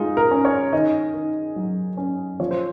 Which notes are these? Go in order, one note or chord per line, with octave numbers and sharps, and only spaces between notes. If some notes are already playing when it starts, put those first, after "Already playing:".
Already playing: G#3 D#4 F4
A#4
C#4
C#5
D#3 D#5
D#3
F#3
C#4
F3 C#5
C5